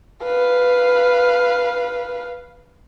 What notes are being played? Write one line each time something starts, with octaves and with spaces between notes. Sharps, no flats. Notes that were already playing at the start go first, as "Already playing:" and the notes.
B4 F5